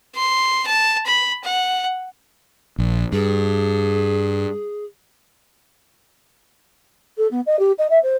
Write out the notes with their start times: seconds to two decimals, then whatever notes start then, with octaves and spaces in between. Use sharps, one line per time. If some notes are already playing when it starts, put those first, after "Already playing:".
0.16 C6
0.66 A5
1.06 B5
1.43 F#5
2.78 A#1
3.13 G2 G#4
7.18 A4
7.31 B3
7.46 D#5
7.59 G4
7.78 D#5
7.90 E5
8.03 C5